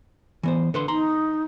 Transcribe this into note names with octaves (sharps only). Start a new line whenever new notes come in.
E3 B3 C5
D3 B4 C6
D#4 A#5 C6